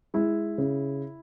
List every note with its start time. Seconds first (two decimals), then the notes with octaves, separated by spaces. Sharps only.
0.14 G#3 E4
0.58 C#3